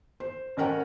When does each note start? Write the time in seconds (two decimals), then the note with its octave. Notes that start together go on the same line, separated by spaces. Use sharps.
0.20 C5
0.57 A1 C#4 A#4 F#5 G5